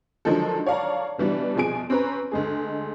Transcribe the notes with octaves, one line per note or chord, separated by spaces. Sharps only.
D3 D#3 F3 F#3 G#3 A4
C#5 D5 F5 A5 A#5
B2 E3 G3 D4
C2 B2 F3 G#4 G#5 D7
C4 C#4 B4 A#5
D2 G#3 G#4